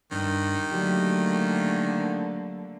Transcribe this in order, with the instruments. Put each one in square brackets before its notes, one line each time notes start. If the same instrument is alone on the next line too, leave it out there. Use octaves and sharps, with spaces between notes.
[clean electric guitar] G2 D4 [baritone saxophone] D#3
[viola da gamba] D3 A3 A#3 [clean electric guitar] F#3 G4